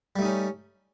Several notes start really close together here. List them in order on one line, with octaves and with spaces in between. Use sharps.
G3 A3 D#4 C#4